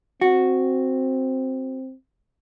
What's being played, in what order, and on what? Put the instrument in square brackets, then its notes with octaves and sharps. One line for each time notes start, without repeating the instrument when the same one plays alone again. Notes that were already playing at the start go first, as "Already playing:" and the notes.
[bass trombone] C4 [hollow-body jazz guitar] F#4